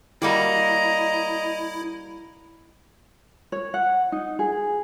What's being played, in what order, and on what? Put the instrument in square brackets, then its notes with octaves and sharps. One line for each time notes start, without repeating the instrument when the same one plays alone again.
[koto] G3 A#3 F#4 [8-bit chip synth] E4 [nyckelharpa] D#5 A#5
[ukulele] C#5
F#5
D#4
G#4